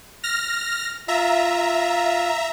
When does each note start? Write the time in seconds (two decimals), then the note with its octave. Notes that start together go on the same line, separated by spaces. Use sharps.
0.24 F6 A#6
1.08 F4 E5 A#5